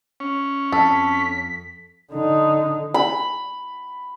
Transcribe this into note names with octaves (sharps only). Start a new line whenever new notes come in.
C#4
F2 A4 B6
D3 D#4
B5